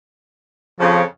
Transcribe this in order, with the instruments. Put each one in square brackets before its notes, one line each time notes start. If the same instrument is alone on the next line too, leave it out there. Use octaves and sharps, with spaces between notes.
[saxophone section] F2 C#3 [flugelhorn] F3